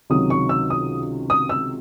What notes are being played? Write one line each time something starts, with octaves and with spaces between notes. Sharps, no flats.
C#2 C3 D#3 F#3 C#4 D#6
C#6
E6
D#6
D#6
E6